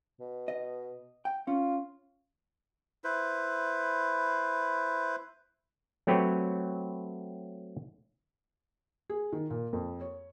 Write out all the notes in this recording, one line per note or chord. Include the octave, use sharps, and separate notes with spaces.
B2
D#5
G5
C#4 F4
E4 B4 C5
F#3 A3 C4 G4 B4 C#5
G#4
D#3
A#2
F2
C#5